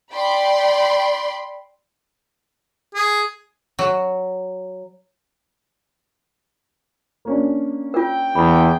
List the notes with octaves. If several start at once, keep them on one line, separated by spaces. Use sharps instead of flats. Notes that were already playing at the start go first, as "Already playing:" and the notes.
D5 G5 B5 C6
G#4
F#3
A#3 C#4 D4
F4 A#4 G5
E2 B5